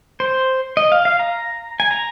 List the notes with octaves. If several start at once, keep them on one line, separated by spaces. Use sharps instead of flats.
C5
D#5
F5
F5
A#5
G#5
A#5